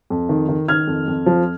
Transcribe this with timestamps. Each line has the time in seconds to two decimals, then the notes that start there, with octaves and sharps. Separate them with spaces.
0.10 F2
0.29 D#3
0.49 D#3
0.68 D#3 F6 G#6
0.87 F2
1.08 F2
1.26 F3